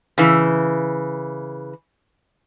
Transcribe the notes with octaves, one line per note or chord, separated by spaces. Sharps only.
C#3 E3